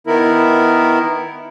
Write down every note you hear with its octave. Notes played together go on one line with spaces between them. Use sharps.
D#3 B3 E4 A#4